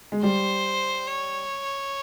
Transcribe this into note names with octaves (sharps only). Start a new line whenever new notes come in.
G#3
G3 C5
C#5